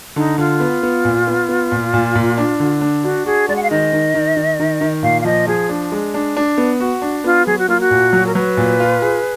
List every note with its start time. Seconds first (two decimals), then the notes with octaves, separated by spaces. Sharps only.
0.16 D3 D#4
0.38 D3 F4
0.60 B3
0.83 B3
1.05 A#2
1.27 B3
1.49 B3
1.72 A#2
1.94 A#2
2.15 A#2
2.37 D4
2.60 D3
2.81 D4
3.04 D4 F#4
3.26 F#4 G#4
3.48 G#3 D5
3.56 F#5
3.63 F5
3.70 D#3 D#5
3.93 D#3
4.14 D#3
4.37 D#3
4.60 D#3
4.81 D#3
5.03 A#2 F5
5.21 F5
5.25 F3 D#5
5.47 F3 G#4
5.69 D4
5.92 G#3
6.14 D4
6.37 D4
6.58 B3
6.80 F#4
7.02 D4
7.24 B3 F4
7.46 F#3 G#4
7.58 F#4
7.68 A#3 F4
7.80 F#4
7.91 A#2
8.13 F#3
8.26 A#4
8.35 F#3 B4
8.57 A#2
8.80 F4
9.02 G#4